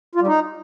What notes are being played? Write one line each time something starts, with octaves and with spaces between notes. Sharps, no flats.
F4
G3
D#4